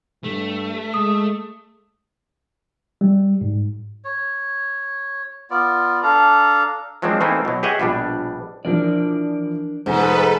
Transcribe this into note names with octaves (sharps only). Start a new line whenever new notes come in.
G2 A3
G#3 D#6
G3
G#2
C#5
B3 F4 D5
D4 A4 F5 A#5
F3 F#3 G#3 A#3 C4 D4
E3 A3 A#3 C4 D#4 E4
B2 F#3
G4 G#4 C#5 D#5 E5 F#5
A#1 B2 G3 D4
E3 F3 D4 A#4 D5
F1 G#2 A4 B4 G#5 B6